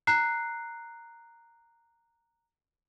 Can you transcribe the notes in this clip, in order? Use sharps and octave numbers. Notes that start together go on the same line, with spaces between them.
A#5 F#6 C7